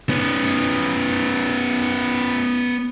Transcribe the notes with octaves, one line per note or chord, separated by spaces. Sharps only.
B3 C#4